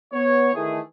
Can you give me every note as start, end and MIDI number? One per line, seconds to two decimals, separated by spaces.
0.13 0.51 59
0.13 0.51 73
0.54 0.80 51
0.54 0.80 52
0.54 0.80 57
0.54 0.80 68